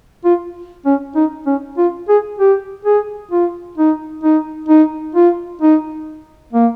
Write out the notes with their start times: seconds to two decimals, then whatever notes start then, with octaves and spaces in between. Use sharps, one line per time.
0.25 F4
0.86 C#4
1.16 D#4
1.46 C#4
1.78 F4
2.09 G#4
2.39 G4
2.85 G#4
3.31 F4
3.78 D#4
4.23 D#4
4.69 D#4
5.15 F4
5.62 D#4
6.53 A#3